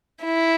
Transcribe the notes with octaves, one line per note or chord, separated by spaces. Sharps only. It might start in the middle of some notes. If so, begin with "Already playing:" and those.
E4